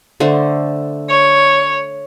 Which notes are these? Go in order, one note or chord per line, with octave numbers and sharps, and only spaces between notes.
D3 A3 C5
C#5